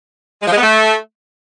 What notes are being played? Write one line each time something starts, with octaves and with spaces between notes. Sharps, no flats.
G#3
F3
G#3
B3
A3